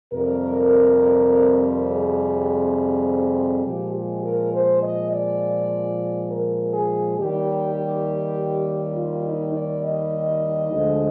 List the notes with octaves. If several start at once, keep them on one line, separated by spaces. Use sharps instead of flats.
F2 C3 G3 A#4
G#4
A#2 F3 G#3 G4
G4
A#4
C5
D#5
D5
A#4
G#4
D#2 D#3 G3 G4
F4
D#4
D5
D#5
D2 D3 F3 G#3